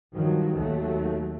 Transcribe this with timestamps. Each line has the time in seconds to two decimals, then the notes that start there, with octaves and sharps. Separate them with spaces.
0.13 G2 D#3 F3 F#3
0.57 D#2 F#3 A3